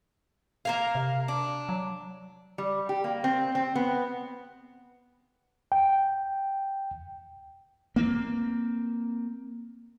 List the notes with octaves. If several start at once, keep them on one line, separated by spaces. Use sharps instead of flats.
A#3 A#4 F5
C3
D4
F#3
G3
G4
A#3
C4
C4
B3
G5
A#3 C4